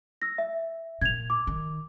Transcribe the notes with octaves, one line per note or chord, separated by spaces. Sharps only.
E6 A#6
E5
A#2 G#6 F7
D6
D#3